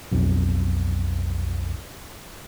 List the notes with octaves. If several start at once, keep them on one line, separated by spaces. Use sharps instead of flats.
B1 F2